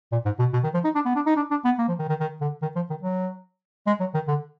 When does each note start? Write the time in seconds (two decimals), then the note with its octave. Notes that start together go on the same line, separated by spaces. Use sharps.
0.12 A#2
0.25 G#2
0.39 B2
0.53 B2
0.64 D#3
0.74 F3
0.85 D#4
0.95 D4
1.06 B3
1.16 D4
1.27 D#4
1.36 D4
1.51 D4
1.65 B3
1.79 A#3
1.88 F3
1.99 D#3
2.09 D#3
2.20 D#3
2.41 D3
2.62 D#3
2.76 F3
2.90 D#3
3.03 F#3
3.87 G#3
4.00 F#3
4.14 D#3
4.28 D3